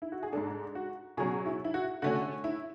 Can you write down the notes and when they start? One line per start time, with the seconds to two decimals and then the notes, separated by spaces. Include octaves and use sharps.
0.02 E4
0.12 F#4
0.23 G#4
0.33 G#2 G#3 D4 A4
0.75 F#4
1.17 B2 F#3 C#4 G#4
1.46 E4
1.64 E4
1.74 F#4
2.02 D3 A3 C#4 F#4
2.44 E4